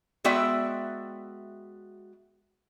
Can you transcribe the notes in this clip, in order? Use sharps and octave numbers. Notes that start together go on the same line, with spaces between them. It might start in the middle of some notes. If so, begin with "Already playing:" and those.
G#3 B3 F#4 D5 E5 G5